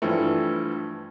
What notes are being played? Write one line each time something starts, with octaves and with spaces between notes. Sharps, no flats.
G2 E3 F3 A3